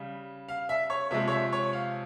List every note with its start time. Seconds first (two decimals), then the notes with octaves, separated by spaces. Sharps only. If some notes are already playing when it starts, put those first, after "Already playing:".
Already playing: C#3 G3
0.49 F5
0.69 E5
0.90 C#5
1.11 C3 F3 G#3 E5
1.28 C#5
1.32 E5
1.53 C#5
1.73 F5